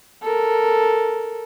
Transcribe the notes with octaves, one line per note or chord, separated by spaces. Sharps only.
A4 A#4